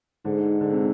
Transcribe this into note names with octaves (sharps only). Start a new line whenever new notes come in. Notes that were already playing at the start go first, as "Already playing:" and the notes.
G#2 D3
D3
C3